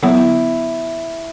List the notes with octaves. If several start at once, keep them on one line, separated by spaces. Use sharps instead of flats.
D3 F#3 B3 E4